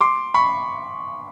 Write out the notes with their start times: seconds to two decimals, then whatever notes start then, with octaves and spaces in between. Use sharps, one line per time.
0.01 C6 D6
0.34 B5 C#6